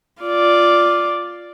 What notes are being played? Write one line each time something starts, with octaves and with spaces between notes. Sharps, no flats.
F4 D5